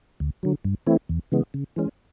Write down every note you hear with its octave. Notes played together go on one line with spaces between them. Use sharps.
D2
D3 F#3
G2
E3 A3 C4 E4
E2
C#3 E3 G#3 B3
C#3
E3 G#3 C#4